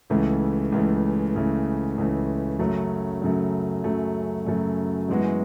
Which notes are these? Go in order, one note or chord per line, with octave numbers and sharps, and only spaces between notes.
C#2 C#3 E3 A3
C#2 C#3 E3 A3
C#2 C#3 E3 A3
C#2 C#3 E3 A3
F#2 C#3 F#3 A3
F#2 C#3 F#3 A3
F#2 C#3 F#3 A3
F#2 C#3 F#3 A3
F#2 E3 G#3 B3 F#4